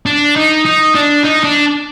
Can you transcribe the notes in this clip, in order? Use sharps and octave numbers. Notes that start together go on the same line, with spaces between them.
D4
D#4
D#4
D4
D#4
D4